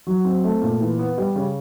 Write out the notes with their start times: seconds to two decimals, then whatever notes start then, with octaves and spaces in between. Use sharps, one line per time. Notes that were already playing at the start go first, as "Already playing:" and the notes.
0.07 F#3
0.25 C4
0.44 A3
0.62 A#2
0.80 E3
0.99 B3
1.18 G3
1.35 C#3